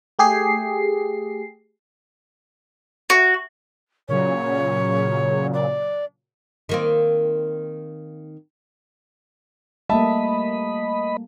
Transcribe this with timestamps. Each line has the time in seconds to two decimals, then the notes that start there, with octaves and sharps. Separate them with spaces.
0.19 A3 G4 G#4 C7
3.10 F#4
4.09 A#2 C#3 F#3 C#5
5.53 D5
6.69 D#3 A#3 C4
9.90 G3 A3 A#3 D#5 E5 A5 B5